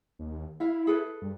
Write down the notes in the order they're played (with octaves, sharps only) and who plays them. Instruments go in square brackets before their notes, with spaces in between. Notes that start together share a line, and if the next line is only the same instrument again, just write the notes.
[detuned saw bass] D#2
[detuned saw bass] E4 [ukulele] E5 F5
[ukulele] G#4 A4 B4
[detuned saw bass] G2